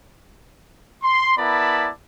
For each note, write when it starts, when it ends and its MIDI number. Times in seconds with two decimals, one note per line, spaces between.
1.03 1.33 84
1.38 1.90 59
1.38 1.90 64
1.38 1.90 70
1.38 1.90 74
1.38 1.90 81
1.38 1.90 83